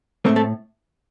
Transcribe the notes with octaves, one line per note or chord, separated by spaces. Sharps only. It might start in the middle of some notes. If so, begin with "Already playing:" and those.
A2 A3 A#3 C4 A#4
A3 A4